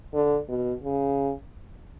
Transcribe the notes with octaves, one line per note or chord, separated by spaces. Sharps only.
D3
B2
C#3